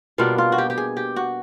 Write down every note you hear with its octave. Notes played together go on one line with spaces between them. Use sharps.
B2 G3 A#3 D4 F4
F4
F#4
G4
G4
G#4
G4
F#4